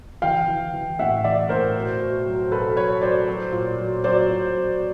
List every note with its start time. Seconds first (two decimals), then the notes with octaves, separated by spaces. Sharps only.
0.22 E3 F5 G5
0.48 E3
0.73 E3
0.99 A2 E5 F#5
1.24 E3 D5 E5
1.49 A2 A#4 C5
1.76 B2
2.00 B2
2.26 F#3
2.52 B2 A4 B4
2.76 F#3 B4 C#5
3.02 F#3 C5 D5
3.28 F#3
3.52 A#2
3.79 F#3
4.04 F#3 C5 D5
4.29 A#2
4.55 F#3